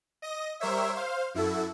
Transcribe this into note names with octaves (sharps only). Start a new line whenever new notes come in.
D#5 A#6
G3 A#4 C5 C#5 E5
C5 F5
F#2 E4 F#4 A4